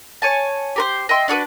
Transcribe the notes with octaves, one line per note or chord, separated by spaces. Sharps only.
C#5 G#5 A5
G4 A#4 C5
D#5 E5 G5 C6
D4 F#4 G#4 B4